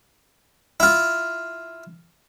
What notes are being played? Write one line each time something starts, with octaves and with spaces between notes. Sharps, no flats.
E4 F4